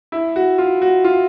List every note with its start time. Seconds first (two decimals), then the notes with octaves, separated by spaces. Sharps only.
0.12 E4
0.36 F#4
0.58 F4
0.82 F#4
1.04 F4